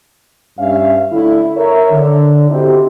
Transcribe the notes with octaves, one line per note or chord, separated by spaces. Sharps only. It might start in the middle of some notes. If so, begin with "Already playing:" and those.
G2 C#4 E5 F5
D3 A3 E4
A#4 C#5 E5
D3
C4 D#4 E4 F#4 G4